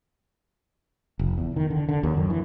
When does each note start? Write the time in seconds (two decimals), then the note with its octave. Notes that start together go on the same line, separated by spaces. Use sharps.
1.19 F1
1.38 E2
1.56 D#3
1.70 D3
1.89 D3
2.03 D#2
2.17 F#2
2.30 E3